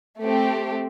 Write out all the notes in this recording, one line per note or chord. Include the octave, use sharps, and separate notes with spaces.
A3 C4 G4